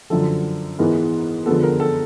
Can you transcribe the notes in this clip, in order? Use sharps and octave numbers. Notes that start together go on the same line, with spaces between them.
F#2 D3 F3 A4
G#2 E3 G#3 B3 A#4
D3 F3 G#3 B3 A4
A#4
A4